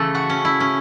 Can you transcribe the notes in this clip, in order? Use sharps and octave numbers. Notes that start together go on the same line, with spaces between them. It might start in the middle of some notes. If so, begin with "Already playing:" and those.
Already playing: C#3 E3 A3 A4
F#4
C#4
E4
C#4